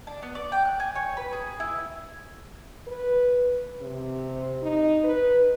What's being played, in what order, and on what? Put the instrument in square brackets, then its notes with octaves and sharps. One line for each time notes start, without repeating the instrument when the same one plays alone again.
[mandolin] D4
B3
D5
G5
F#6
G#5
C#5
B4
G#4
E4
[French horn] B4
C3
D#4
B4